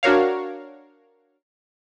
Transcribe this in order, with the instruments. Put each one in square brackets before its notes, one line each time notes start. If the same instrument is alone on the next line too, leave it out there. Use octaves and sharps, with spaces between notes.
[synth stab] D4 F#4 A#4 C#5 F5